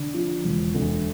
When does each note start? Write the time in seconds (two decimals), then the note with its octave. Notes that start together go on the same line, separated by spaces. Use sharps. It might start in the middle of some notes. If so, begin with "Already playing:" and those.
Already playing: D3
0.14 F3
0.44 E1
0.75 D2